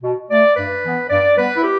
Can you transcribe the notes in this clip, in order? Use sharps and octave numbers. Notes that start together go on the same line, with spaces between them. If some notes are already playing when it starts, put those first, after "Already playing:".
B2
A3 D5
G2 B4
E3 B3
G2 D5
G3 B3 B4
E4
G4